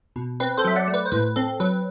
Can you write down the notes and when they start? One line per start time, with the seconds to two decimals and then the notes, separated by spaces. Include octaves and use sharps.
0.16 B2
0.40 C4 B4
0.57 A4 C5
0.65 F#3 E5
0.76 D5 F#5
0.88 A3
0.94 B4
1.06 C5
1.12 A2 B4
1.36 C4 A4
1.60 F#3 B4